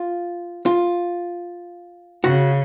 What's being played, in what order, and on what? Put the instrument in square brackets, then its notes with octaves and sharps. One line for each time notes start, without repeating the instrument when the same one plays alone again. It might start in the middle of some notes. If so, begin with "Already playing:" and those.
Already playing: [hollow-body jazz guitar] F4
F4
[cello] C#3 [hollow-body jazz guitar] F#4